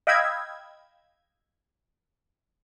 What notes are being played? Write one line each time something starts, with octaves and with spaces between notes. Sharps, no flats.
D#5 F5 G5 B5 E6 G#6